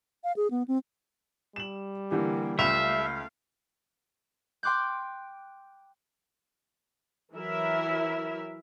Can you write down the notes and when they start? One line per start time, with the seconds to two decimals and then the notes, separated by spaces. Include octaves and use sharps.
0.24 F5
0.36 G#4
0.51 B3
0.68 C4
1.56 G3 E7 F#7
2.11 D3 E3 A#3 G4
2.59 C#2 A3 E5 F5 B5 F7
4.63 G5 C6 D6 F#6 G6
7.34 E3 F#3 E4 A#4 E5